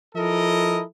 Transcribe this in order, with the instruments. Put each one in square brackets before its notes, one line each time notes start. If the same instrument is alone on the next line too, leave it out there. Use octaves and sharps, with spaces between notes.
[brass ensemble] F3 E4 A4 A#4 D#5